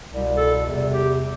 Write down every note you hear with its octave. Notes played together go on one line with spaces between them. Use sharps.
C2 B2 G3
A4
E2 C3 G3
G4